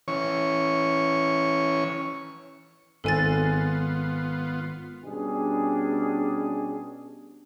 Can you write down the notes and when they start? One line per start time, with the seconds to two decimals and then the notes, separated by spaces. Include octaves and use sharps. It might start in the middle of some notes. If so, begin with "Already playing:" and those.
0.08 E3 C#4 C#5 C#6
3.04 G#1 B3 F4 A4 G#5 A6
5.04 B2 G3 C#4 D4 G#4